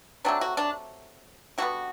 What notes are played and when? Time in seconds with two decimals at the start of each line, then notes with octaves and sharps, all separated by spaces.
0.25 C3 F#3 A3 D4
0.41 F#4
0.57 D4
1.58 D3 G3 B3 F#4